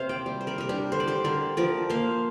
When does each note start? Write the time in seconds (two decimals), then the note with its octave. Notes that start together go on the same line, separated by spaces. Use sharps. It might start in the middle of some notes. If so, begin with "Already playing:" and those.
Already playing: C3 A#3 C5 F5
0.09 D5 G5
0.26 G3
0.41 C5
0.47 A#4 D5
0.58 G3 A#4
0.69 D4 G4
0.92 D3 C5
1.00 D5
1.07 G4 C5
1.24 D3 A#4 D5
1.57 F3 A#4 D5
1.90 A#3 C5 F5